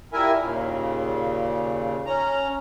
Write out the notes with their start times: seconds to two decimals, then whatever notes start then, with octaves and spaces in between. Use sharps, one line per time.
0.13 F3 G3 E4 A#4 E5 G#5
0.40 D#2 A#2 C#3
2.06 C#4 A#5